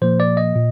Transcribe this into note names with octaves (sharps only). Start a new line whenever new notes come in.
A#2 F3 A#3 C5
D5
D#5
A#2